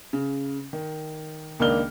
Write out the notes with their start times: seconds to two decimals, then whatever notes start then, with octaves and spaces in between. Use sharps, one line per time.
0.13 C#3
0.73 D#3
1.60 C#2 D#3 A#3 D4 F6 G7